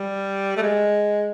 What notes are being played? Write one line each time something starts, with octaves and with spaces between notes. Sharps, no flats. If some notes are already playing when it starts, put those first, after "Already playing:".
Already playing: G3
A3
G#3